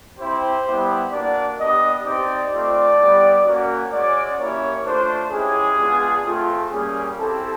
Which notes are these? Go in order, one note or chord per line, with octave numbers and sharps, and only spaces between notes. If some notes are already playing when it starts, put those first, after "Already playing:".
C4 E4 G4 C5
G3 B3 E4 G4
A#3 D4 F#4 D5
B3 D4 G4 D#5
C4 D#4 G4 D5
A3 C4 F4 D5
G3 B3 E4 G4
A#3 C#4 F#4
G#3 C#4 F#4 D5
A#3 C#4 E4 G4 C#5
A3 D4 F4 C5
G#3 C#4 E4 G4 G#4
G#3 B3 D4 F4
A3 C4 F4
G3 A#3 C#4 G#4
C4 E4 G4 A4